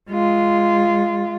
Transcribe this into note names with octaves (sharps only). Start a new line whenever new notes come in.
G#3 F4